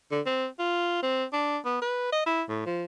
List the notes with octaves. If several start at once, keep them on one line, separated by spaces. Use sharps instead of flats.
D3
C4
F4
C4
D4
B3
B4
D#5
E4
A2
F3